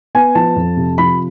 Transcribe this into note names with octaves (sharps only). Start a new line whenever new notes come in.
B3 G#5
F3 A5
F2
C3
F3 B5